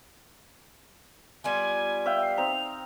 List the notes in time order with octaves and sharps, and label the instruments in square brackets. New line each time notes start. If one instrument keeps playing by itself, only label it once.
[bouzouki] G3 B3 F4 [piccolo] G#5
[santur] E5 F5 G5
[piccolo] C7
[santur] C4 D#4 [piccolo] F7